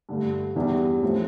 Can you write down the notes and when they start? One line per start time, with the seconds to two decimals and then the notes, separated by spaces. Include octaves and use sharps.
0.09 G2 D3 A3
0.56 E2 E3 G3 D4 G4
1.03 A2 F3 C4